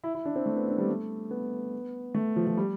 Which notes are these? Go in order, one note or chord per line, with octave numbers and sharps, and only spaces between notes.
E4
E4
D4
C4
A3
B3
D4
G3
A3
B3
A3
F3
F3
G3